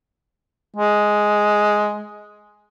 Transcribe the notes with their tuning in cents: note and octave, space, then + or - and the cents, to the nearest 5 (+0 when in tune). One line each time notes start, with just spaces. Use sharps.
G#3 +5